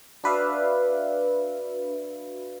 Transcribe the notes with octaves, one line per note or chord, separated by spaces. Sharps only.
D4 F#4 B4 D5 E5 F5